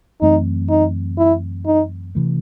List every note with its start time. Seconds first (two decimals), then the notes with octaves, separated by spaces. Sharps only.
0.22 F#2 E3 A3 C4 D#4
0.70 D#4
1.18 E4
1.66 D#4
2.15 C3 E3 A3